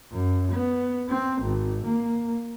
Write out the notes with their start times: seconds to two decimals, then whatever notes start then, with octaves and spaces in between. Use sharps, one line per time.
0.12 F#2
0.52 B3
1.09 C4
1.42 G#1
1.85 A#3